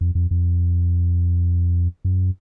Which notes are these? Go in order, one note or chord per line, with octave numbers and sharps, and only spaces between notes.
F2
F2
F2
F#2